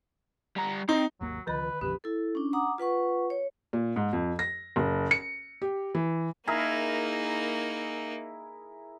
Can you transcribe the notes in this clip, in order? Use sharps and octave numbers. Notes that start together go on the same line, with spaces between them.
G3 A#5
C4 D#4
G#1 D#2 F#3 A#3
C#2 D3 D#3 F3 B4 D#5
A#1 F2 C#3 G4 B4
E4 A4
C#4 D4
F#5 A#5 D6 D#6
F4 B4 F#5 C#6
C#5
A#2
G#2
F2
A#6
F#1
C#7
G4
E3
A#3 D#4 E4 G#4 A#4